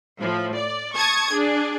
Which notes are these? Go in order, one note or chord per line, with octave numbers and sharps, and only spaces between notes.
A2 F3
D5
A5 C#6 D#6 G#6
D4 G#4